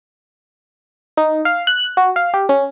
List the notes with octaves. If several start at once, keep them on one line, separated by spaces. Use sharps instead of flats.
D#4
F5
F#6
F#4
F5
G4
C#4